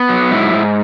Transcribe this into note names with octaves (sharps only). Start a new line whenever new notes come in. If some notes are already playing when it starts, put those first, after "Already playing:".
Already playing: B3
F#3
G#2 E4
G#2